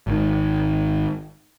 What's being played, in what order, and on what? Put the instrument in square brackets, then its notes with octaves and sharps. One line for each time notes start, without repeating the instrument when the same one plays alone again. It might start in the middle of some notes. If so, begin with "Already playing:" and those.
[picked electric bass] G#1 D#3